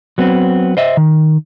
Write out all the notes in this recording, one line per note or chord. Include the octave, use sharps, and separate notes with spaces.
F#3 B3 C4
C5 D#5 E5
D#3